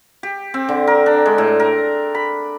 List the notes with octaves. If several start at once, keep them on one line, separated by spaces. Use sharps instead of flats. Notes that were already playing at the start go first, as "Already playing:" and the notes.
G4
C4
D3
A#4
D4
G#3
A2
A#4
B5